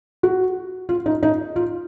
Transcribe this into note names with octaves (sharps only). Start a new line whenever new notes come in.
F#4
F4
D#4
D#4
F4